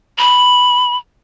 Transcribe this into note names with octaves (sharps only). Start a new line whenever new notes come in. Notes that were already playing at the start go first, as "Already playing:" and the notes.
B5